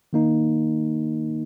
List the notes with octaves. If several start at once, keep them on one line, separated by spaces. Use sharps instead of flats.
D#3 A#3 D#4